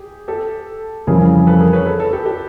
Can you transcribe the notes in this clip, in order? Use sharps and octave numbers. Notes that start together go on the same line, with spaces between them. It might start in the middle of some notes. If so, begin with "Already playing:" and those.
Already playing: G4 G#4
G4 A4
F2 C#3 E3 G3 G#4 A#4
A4 B4
G#4 A#4
B4 C#5
A4 B4
A4 B4
G4 A4
G4 A4